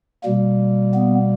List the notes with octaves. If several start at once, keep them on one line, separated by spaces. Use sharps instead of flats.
B2 G3 A#3
B3